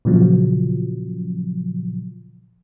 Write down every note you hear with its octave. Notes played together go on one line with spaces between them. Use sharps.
A#2 C#3 F3 F#3